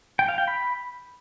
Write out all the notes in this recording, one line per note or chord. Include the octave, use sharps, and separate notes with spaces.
G5
F5
G5
B5